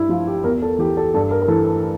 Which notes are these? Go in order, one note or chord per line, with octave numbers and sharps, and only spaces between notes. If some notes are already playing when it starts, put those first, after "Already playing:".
Already playing: G2 E4
F3 F4
G4
E2 A#4
A4
E3 G4
A4
G2 A4
A#4
A#4
E3 A4